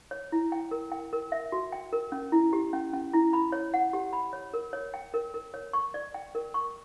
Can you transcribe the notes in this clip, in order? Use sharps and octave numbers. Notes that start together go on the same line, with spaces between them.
C#5
E4
G5
A#4
G5
A#4
E5
F#4
G5
A#4
C#4
E4
G4
C#4
C#4
E4
B5
C#5
F#5
G4
B5
C#5
A#4
C#5
G5
A#4
A#4
C#5
C#6
D5
G5
A#4
C#6